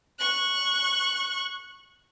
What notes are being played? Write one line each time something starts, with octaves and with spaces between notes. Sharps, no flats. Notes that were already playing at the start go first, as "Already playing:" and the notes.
C#6 F#6